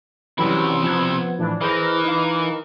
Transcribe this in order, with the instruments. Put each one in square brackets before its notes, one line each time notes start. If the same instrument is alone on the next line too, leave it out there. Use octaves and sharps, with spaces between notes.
[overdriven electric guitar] C3 E4 [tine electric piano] E3 C#4 G4 [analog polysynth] F#3 G3
[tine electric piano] F3 G#6 [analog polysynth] B3
[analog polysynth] A2 E3 D4
[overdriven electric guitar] E3 [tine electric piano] E4 G#4 C5 [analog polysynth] A#4 D#5
[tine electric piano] D#4 F5